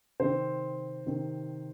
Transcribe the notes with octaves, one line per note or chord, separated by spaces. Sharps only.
C3 D#3 C4 C5
C3 D#3 C4